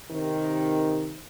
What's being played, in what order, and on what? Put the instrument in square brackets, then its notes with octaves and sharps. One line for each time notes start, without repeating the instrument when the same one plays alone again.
[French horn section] C3 D#3